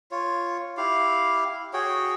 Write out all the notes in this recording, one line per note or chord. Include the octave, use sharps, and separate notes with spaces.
F4 C#5
E4 G4 F5
F#4 G#4 C#5 G5